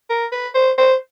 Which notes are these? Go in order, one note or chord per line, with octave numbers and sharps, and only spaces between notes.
A#4
B4
C5
C5